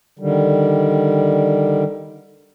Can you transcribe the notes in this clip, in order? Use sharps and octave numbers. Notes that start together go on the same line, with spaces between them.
D3 D#3 G3